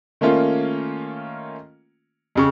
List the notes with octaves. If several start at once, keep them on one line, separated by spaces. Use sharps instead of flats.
D#3 A3 A#3 C#4 F4
F2 C#3 C#6